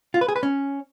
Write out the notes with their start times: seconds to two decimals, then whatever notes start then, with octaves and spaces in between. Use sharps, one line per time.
0.14 F4
0.21 B4
0.28 G#4
0.36 B4
0.43 C#4